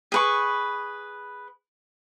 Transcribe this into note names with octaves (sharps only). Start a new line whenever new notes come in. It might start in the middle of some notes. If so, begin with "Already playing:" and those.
G#4 B4 C#6